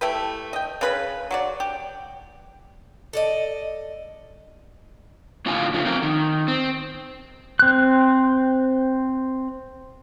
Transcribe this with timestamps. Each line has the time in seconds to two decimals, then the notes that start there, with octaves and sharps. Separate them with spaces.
0.01 A3 E4 G4 B4
0.53 D#5 G5
0.81 C#3 B4 B5
1.31 F#3 F#4 D5
1.60 G4
3.13 A4 D5 D#5
5.46 F2 A2 D3 F4 F5 G#5
5.74 C#3 F3 A3
5.86 C4 A#4
6.02 D#3
6.48 C4
7.59 C4 F#6